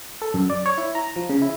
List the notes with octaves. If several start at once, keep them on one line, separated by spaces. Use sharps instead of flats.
A4
F#2
D5
C#5
E4
A#5
F3
C#3
E4